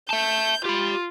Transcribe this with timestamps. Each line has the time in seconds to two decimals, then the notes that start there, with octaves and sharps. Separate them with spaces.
0.10 E5 A5 G6
0.65 F4 G4 B5